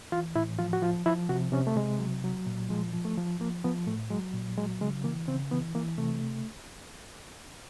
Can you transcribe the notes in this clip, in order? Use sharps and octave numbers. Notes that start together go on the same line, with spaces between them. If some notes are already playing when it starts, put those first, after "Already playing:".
E3 F4
A2 E4
F3 F4
F#4
F3 F4
F3 E4
C3 F#4
C3 C#4
A3
C3 G#3
F#3
F#3
A#2
F3 G#3
F3
A3
F3
F3 A#3
F3 B3
A2 A3
F#3 G#3
A#2
F#3 G#3
C#3 G#3
E3 A#3
C#3 C4
E3 B3
E3 A#3
C3 A3